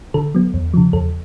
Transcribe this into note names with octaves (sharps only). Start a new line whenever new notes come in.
D3 A4
F#3 B3
E2
C#3 F3
E2 A4